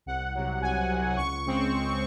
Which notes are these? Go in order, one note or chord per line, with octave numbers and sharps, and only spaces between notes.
C2 F#5
C3 F#3
C2 G#5
C3 F#3
C#2 C#6
C#3 G#3 C4
C#2